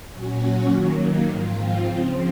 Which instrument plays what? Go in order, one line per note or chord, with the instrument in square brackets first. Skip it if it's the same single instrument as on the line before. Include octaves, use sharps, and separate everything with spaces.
[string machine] A#2 F#3 C#4 F#4
D#3 F#3 A#3
G#2 F3 C4 F4
C#3 F3 C4